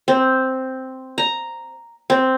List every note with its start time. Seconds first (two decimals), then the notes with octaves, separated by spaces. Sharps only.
0.08 C4
1.18 A#5
2.10 C4